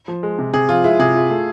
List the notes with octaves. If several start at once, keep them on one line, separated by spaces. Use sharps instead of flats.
F3
G#3
C3
C3 G#4
F3 F4
G#3 E4
C3 G#4
F4
A3